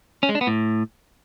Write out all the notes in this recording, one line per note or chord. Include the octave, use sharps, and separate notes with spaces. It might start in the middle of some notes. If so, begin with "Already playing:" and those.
C#4
G#3
D4
B3
A2